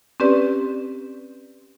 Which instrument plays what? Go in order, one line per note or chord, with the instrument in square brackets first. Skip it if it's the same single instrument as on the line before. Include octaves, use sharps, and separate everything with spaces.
[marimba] C4 C#4 G4 B4 D5